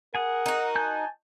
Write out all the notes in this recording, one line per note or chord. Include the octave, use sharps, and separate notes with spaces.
G#4 A#4 F#5 G#5
D#4 F#4
G#5 A5 G6